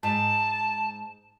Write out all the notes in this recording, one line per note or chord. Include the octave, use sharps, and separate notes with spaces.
G#2 A5